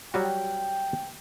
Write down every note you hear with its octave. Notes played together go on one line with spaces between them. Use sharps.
F#3 G3 F#4 G5